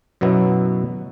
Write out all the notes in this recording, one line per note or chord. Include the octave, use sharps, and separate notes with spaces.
F#2 B2 F#3 B3 E4